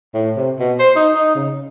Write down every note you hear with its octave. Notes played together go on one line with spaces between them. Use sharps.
A2
C3
B2
C5
D#4
D#4
C#3